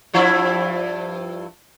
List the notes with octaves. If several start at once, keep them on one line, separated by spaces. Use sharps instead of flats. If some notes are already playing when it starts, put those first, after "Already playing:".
G2 F3 E4